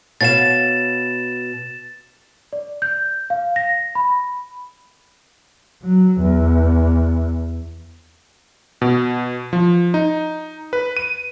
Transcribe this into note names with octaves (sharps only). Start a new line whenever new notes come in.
B2 C#5 F5 A6 E7
D5
G6
F5
A#6
B5
F#3
E2
B2
F3
D#4
B4
D#7